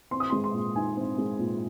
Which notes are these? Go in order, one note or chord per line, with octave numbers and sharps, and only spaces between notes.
C4 C6
D#6
G#3 C6
C6
A#2
D#4 G#5
C4
G#3
A#2